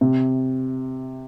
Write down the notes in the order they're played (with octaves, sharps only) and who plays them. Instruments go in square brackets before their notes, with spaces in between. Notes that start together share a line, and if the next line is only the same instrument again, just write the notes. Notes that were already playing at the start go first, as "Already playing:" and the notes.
[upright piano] C3